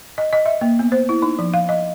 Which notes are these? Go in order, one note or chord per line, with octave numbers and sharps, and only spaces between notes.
D#5
D#5
E5
A#3
B3
C5
E4
D#4
F3
F5
D#5